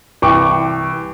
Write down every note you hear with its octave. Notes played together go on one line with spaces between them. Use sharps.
C2 E3 G5 C#6 D6